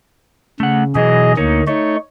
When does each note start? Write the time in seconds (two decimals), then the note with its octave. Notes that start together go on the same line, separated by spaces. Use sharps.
0.60 C#3 A3 F#5
0.95 B2 E3 F#3 G#4 D#5
1.37 D2 A#3 D#4 C#5
1.67 A3 D#4 C#5